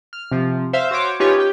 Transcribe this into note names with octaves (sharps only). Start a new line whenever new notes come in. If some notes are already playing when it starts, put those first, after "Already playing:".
F6
C3 F3
C5 E5 F5
F#4 C5 C#5 D6
C#4 D#4 F4 G4 B4 C#5
G4 G5